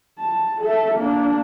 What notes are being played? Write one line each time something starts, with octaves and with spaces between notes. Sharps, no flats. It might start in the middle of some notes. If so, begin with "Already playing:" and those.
A5
A4 E5
A#3 D4